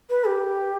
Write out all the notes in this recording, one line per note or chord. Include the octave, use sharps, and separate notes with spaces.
B4
G4